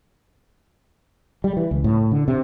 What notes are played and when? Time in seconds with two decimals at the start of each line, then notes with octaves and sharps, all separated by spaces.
1.44 G3
1.57 E3
1.71 C#2
1.84 A2
2.12 D3
2.28 C3